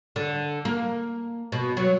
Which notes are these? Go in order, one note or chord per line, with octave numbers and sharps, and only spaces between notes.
D3
A#3
B2
F#3